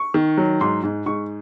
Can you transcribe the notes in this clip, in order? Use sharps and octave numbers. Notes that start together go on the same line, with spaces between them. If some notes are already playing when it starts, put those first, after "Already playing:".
Already playing: C#6
D#3
F#3
G#2 C6
G#2
G#2 C#6